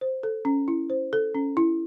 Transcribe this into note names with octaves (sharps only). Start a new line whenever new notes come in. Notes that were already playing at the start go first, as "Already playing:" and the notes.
C5
A4
C#4
E4
C5
A4
C#4
E4